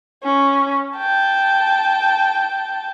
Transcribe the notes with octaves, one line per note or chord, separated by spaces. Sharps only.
C#4
G5 A5